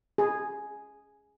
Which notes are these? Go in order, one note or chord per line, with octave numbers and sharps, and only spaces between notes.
G#4